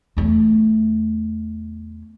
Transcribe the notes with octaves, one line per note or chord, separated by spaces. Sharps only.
E2 A3